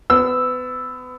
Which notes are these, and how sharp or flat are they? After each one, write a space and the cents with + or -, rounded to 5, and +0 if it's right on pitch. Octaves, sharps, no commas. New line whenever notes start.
B3 +30 E6 +0